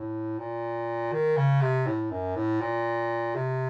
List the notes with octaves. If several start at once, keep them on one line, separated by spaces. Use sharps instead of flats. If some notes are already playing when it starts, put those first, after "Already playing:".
Already playing: A2
A#2
D#3
C#3
C3
A2
F#2
A2
A#2
C3